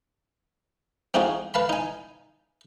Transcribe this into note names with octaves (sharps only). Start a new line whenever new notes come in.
C4 D#4 F4 F#4 G#4
B4 F5 A5 B5
D#4 G#5